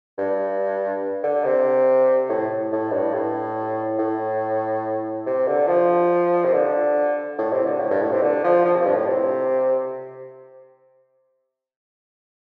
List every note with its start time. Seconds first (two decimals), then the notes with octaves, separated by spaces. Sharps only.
0.18 G2
1.23 D3
1.45 C3
2.29 A2
2.72 A2
2.92 G2
3.14 A2
3.99 A2
5.26 C3
5.48 D3
5.68 F3
6.45 C3
6.54 D3
7.38 A2
7.52 C3
7.66 D3
7.80 A2
7.90 G2
8.02 A2
8.12 C3
8.23 D3
8.44 F3
8.65 F3
8.76 C3
8.85 G2
8.96 A2
9.08 C3